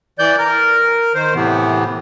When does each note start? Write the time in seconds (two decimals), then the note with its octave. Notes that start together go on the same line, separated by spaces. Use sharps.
0.19 E3 D5 G6
0.38 A#4
1.14 D#3 C5
1.34 A2 C3 E3 B3